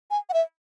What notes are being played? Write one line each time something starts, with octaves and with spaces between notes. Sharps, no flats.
G#5
F#5
E5